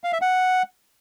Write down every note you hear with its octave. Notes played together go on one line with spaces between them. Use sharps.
F5
E5
F#5